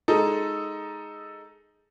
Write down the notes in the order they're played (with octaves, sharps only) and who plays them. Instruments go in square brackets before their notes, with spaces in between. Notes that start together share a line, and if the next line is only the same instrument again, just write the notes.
[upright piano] G#3 D#4 A4